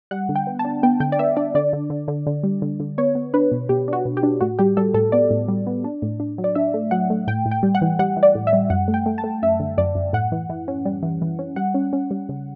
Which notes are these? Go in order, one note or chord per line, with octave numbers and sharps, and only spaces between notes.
G3 F#5
D3
G5
B3
A5
D4
B3 G5
D3 G5
D5
B3 E5
D4 D5
D3 D5
D3
D3
D3
D3
G3
D3
D3
B3 C#5
B3
D4 B4
B2
B2 G4
D4 F#4
B2
G4
D4
A2 F#4
G3 G4
G3 A4
A2 A4
B3 D5
A2
G3
B3
D4
A2
D4
F#3
D5
D4 E5
A3
F#3 F#5
A3
A2 G5
A2
G5
G3
F#5
E3
G3 F#5
E3
D5
A2
E5
G3
F#2 F#5
A3
G5
A3
A5
A3
F#2 E5
D3
F#2 D5
F#2
A2 F#5
E3
E3
C#4
G3
E3
E3
C#4
G3 F#5
C#4
C#4
G3
C#3